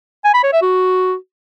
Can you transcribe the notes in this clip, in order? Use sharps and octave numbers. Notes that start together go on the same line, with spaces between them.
G#5
B5
C#5
E5
F#4